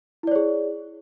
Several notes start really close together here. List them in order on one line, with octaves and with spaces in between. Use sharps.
E4 D5 C#5 G#4